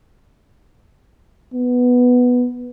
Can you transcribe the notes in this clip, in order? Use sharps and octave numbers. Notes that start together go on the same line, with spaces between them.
B3